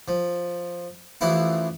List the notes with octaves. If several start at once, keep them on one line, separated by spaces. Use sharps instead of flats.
F3
A1 E3 F3 E4 F5